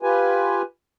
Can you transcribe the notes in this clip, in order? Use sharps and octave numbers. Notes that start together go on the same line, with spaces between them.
F4 G4 B4 G#5